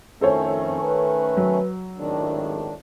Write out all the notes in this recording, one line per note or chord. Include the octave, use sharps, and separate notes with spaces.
F2 A2 D#3 A3 C#4 A4 C5 C#5
B4
F#3
G#1 C#2 A2 D#3 D4